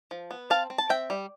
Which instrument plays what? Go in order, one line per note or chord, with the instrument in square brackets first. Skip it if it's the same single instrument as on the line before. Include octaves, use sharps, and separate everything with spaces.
[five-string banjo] F3
B3
C4 F5 A5
C4
A5
C4 E5 G5
G3